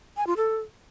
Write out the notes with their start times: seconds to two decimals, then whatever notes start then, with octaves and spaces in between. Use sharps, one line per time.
0.17 G#5
0.27 F4
0.37 A4